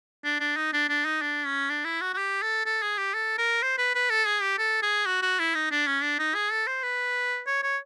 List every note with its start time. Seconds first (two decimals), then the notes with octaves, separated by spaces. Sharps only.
0.24 D4
0.40 D4
0.56 D#4
0.73 D4
0.89 D4
1.05 D#4
1.22 D4
1.46 C#4
1.70 D4
1.85 E4
2.01 F#4
2.13 F#4
2.18 G4
2.42 A4
2.65 A4
2.82 G#4
2.98 G4
3.14 A4
3.38 A#4
3.62 C5
3.78 B4
3.95 B4
4.10 A4
4.26 G#4
4.42 G4
4.58 A4
4.82 G#4
5.06 F#4
5.22 F#4
5.39 E4
5.55 D#4
5.71 D4
5.87 C#4
6.02 D4
6.19 D#4
6.34 G#4
6.51 A4
6.67 C5
6.83 B4
7.46 C#5
7.63 C#5